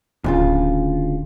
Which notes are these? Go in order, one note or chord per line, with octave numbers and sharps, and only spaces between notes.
D1 D2 C#3 F4